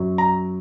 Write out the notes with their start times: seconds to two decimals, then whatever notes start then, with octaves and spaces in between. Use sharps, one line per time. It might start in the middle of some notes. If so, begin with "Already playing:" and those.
Already playing: F#2 F#3
0.18 A#5